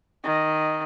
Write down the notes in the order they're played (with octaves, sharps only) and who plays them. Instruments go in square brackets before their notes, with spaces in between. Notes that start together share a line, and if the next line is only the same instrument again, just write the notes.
[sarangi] D#3